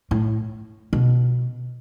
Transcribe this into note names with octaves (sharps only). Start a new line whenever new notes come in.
A2
B2